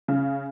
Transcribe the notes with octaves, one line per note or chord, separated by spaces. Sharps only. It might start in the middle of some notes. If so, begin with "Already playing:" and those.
C#3